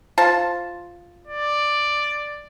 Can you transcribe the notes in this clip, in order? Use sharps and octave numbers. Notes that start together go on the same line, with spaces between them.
F4 C5 A5
D5